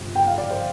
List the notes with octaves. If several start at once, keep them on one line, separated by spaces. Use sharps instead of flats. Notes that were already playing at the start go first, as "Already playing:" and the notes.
Already playing: G1 F2 C3
G5
F5
D5
C5